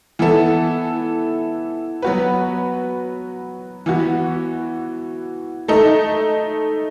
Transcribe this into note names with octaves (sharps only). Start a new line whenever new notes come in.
E3 B3 E4 A4
F#3 B3 F#4 B4
E3 B3 F#4
A3 D#4 A4